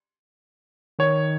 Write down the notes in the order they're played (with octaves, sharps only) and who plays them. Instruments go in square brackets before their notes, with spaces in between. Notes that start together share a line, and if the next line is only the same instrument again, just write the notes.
[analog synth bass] D#3 [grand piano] C#5